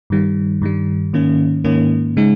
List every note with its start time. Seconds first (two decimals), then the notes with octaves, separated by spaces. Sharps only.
0.10 G2 D#3 G3
0.62 G2 D#3 G3
1.13 G#2 D#3 A#3 C#4
1.64 G#2 D#3 A#3 C#4
2.17 C#3 G#3 D#4